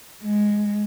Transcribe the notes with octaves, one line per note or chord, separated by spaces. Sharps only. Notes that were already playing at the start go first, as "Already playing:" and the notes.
G#3